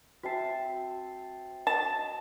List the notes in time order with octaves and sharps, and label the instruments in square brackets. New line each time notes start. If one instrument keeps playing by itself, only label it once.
[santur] C4 E5 A5 [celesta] F#4 C7
[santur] D#5 [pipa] A5